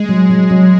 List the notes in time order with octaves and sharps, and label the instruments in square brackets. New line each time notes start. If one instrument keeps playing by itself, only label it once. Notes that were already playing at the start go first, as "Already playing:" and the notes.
Already playing: [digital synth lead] G#3
[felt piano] F#3
F#3
F#3